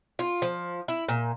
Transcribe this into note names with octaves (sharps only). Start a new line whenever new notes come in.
F4
F3
E4
A#2